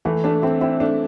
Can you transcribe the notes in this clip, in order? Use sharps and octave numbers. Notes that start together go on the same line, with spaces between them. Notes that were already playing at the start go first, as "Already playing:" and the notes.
E3 A3
A3 D4
C4 E4
C4 E4
A3 D4